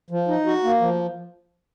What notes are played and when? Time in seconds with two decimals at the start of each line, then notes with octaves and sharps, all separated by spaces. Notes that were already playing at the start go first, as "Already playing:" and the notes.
0.10 F3
0.28 D#4
0.46 F#4
0.64 A#3
0.81 F3